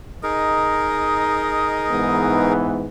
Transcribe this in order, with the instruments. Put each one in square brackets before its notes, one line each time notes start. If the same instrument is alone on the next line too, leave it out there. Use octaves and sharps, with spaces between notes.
[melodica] D#4 G#4 A#4 [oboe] D#5
[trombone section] G#2 E3 B3